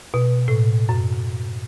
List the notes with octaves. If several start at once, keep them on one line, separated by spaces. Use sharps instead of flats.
B2
A2
F#2